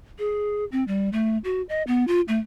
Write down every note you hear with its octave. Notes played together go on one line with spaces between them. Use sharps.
G#4
C4
G3
A3
F#4
D#5
B3
F4
A3